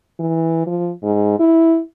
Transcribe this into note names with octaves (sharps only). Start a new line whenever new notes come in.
E3
F3
G#2
E4